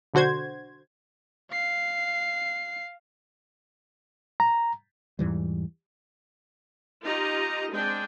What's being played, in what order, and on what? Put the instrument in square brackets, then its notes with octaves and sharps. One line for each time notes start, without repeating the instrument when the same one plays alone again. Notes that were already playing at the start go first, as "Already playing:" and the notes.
[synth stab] B1 D3 F#4 C5 G#6
[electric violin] F5 C7
[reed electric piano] A#5
[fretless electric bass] E2 G#2 E3 G3
[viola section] D#4 F4 G4 D#5 A#5
G#3 C4 D4 G#4 G5